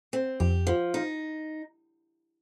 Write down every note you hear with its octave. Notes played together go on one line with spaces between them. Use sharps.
C4
F2 G4
F3
D#4